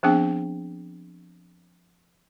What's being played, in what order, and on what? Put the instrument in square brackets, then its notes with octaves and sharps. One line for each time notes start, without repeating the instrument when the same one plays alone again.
[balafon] F3 B3 C4 D4 G#4 G5